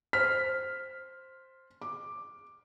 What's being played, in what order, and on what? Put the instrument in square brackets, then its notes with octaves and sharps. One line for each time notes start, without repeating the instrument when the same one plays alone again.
[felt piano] C5 F6 [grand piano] B6
[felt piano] D6